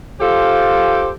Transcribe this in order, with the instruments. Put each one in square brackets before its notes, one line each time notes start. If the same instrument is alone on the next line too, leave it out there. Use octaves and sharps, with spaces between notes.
[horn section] F4 G4 A4 C5